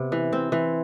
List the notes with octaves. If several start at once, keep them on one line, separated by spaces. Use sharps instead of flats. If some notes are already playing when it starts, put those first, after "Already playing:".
Already playing: C3 B3
E3
C4
E3